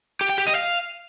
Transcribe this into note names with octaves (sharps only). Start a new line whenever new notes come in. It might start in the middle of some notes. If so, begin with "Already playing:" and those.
G4
G5
G4
D#5
F5